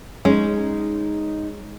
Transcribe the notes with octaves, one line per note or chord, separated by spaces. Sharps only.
G#3 C#4 D#4